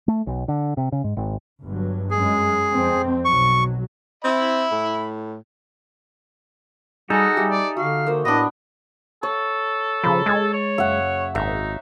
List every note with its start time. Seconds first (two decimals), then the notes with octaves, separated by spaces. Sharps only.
0.08 A3
0.27 B1
0.48 D3
0.77 C3
0.92 C#3
1.04 G#2
1.17 G#1
1.64 G1 G2 F#3
2.11 F#2 G#3 G#4
2.74 F2 C4
3.25 B1 F#3 C#6
4.24 C4 E5 B5
4.72 A2
7.10 G3 D#4 F#4 G#4 A4
7.37 G3 G4 E5
7.51 D5
7.77 D3 F#4 F5
8.07 A#3 C5
8.25 A2 B3 D4 D#5
9.23 A4 C#5
10.04 C#3 F3 A#5 B5
10.26 G#3 G#6 A6
10.53 C#5
10.78 F#1 E5 F#5
11.35 G#1 D#4 E5